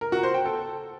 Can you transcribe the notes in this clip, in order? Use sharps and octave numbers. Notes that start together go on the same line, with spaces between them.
A#4
F#4
C5
G5
A4